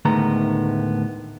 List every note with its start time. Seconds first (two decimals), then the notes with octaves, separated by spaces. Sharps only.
0.05 D2 A2 D#3 G#3 B3 A#5